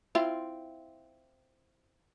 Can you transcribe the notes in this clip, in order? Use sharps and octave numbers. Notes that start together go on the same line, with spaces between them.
C4 E4 F4